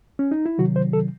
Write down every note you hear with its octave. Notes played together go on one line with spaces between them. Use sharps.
C#4
D#4
E4
C3 D#3 F#3 F#4
C5
A4